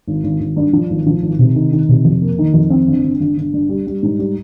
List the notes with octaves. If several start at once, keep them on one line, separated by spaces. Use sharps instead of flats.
G#1
G#1
G#1
G2
F3
G#1
F3
G#1
C3
D#3
D#3
C3
F2
A#3
D#3
F2
C4
G1
G1
G1
G1
G2
G3
G3
G#2
G3